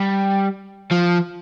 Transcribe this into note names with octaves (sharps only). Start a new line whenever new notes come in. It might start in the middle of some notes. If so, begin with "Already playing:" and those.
Already playing: G3
F3